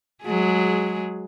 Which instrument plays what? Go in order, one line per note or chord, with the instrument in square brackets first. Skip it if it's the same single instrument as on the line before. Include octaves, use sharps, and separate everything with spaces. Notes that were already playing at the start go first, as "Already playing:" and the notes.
[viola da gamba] F#3 G#3 G#4